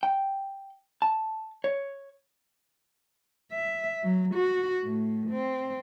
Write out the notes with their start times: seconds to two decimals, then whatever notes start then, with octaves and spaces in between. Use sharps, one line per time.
0.03 G5
1.02 A5
1.64 C#5
3.52 E5
4.04 F#3
4.35 F#4
4.84 A2
5.31 C4